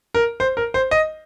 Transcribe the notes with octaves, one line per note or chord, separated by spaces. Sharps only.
A#4
C5
A#4
C5
D#5